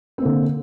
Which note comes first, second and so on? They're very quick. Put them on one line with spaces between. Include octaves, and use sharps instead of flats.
C4 A#3 D3